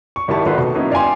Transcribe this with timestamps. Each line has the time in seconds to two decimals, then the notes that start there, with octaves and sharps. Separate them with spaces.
0.16 C#6
0.28 G#1 D#3 E4 G4 A5 C#6
0.45 G#1 D#4 F4 F#4 A4 B4
0.58 B2
0.75 F#3 A#3 B3 C#4 D#4 E4
0.91 D5 F5 G5 G#5 C6